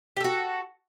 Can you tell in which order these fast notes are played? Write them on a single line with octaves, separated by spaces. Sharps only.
G4 A4 F#4